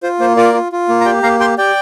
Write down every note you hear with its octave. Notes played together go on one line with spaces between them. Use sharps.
F4 C5
A#3 C5
F4 A#4 D5
F4
F4
A#3
A#5
G4 D5 G5
A#3 F5 A#5
G4 G5 C6
G4 D5 G5